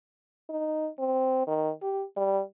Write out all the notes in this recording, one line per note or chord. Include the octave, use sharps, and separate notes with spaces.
D#4
C4
D#3
G4
G3